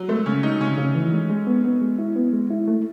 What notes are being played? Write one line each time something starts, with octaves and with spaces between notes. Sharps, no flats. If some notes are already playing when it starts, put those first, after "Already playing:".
Already playing: F#3
G#3 A3
C#3 C#4
G#3 D#4
C#3 C#4
C#3
E3
G#3
G#3
B3
B3
G#3
E4
B3
G#3
E4
A3